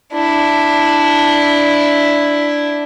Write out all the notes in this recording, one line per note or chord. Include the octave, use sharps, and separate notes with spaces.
D4 E4